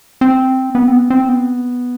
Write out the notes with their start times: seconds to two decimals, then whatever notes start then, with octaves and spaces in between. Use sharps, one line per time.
0.21 C4
0.75 B3
0.88 C4
0.92 B3
1.10 C4
1.29 B3